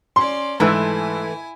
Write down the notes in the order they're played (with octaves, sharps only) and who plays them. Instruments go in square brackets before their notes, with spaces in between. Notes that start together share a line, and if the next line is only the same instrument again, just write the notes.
[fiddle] C#4 D5 [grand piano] C6
[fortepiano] G#2 B4 E6 [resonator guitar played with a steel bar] E3 A3 [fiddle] E4 G#5